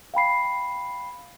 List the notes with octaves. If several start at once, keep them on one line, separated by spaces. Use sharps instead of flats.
F5 G5 B5 C7